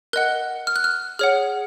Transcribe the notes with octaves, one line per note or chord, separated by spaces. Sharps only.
A#4 D#5 F#5 F#6
F6
F#6
F6
G#4 C#5 F#5 F6